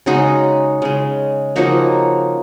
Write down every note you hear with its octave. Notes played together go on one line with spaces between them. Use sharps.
C#3 G#3 D#4 F#4
C#3 G#3
C#3 F3 A#3 D#4 F#4